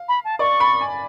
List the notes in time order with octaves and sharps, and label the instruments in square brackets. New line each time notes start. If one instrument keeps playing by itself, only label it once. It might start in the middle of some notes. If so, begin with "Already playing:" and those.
Already playing: [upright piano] F5
[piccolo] B5
A5
[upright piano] D5 [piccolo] C#6
[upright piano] B5
G#5